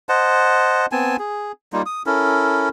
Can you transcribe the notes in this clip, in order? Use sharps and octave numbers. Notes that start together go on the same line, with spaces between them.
C5 D#5 F#5 A5
B3 C4 G#5 A5
G#4
G3 A#3 D#4 F4
D#6
C#4 E4 A4 A#4